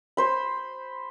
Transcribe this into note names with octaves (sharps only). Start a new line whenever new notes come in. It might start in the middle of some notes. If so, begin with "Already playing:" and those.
C5 B5